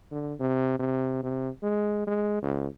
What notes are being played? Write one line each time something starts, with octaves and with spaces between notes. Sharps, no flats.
D3
C3
C3
C3
G#3
G#3
C#2